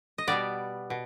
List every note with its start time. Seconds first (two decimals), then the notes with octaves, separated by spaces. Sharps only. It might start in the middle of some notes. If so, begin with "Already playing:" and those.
0.18 D#5
0.27 B2 G3 B3 D5
0.90 B2